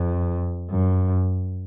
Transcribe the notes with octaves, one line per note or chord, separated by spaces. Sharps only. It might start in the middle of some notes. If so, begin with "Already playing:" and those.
Already playing: F2
F#2